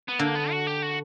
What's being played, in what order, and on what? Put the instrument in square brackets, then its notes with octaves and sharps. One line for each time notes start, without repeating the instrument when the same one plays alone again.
[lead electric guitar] B3
[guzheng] D3 [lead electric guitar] A#3
[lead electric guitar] B3
F#4
G4
F#4